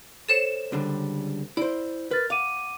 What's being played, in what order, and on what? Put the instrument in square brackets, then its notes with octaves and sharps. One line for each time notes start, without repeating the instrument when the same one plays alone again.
[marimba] A4 C5 C#5 [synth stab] E7
[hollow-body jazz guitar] C#2 D3 G3
[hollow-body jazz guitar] E4 C5 [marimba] D5
[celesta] A#4 F6 A6 [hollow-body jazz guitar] B4
[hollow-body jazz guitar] F5 [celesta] F#5 D6 D#7